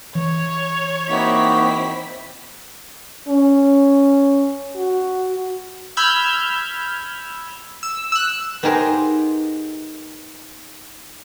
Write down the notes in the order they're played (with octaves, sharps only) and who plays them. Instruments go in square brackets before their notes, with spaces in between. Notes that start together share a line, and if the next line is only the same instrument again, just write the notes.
[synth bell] E3 [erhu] C#5
[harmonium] A#3 D#4 F#4 [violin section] C4 E4 B6
[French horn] C#4
F#4
[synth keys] B5 E6 F6 G6 G#6
E6
E6 F#6
[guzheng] B3 D#4 G4 G#4 A#4 C5